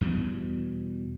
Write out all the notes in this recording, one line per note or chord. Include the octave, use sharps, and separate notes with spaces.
E2 B2 E3 G3